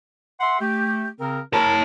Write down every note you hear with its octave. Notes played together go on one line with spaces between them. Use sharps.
E5 F#5 C6
A3 G4
C#3 C4 A#4
E4 A#4 C#5 A5